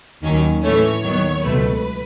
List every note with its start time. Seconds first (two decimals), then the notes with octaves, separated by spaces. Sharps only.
0.22 D#2 D#3 F#3 C#4
0.62 A2 E3 A3 C#4 C#5
1.02 D#2 D#3 F#3 B3
1.43 C#2 B2 F#3 A3 B4